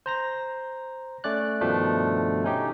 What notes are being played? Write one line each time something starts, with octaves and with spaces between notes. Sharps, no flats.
C5 A#5 A#6
A3 C#4 D5 F#6
G2 B2 D#3 F3 A3 D4
C#4 D#4 G4